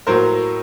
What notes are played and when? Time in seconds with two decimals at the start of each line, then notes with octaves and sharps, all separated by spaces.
0.07 A2 F#3 A#3 A#4 C5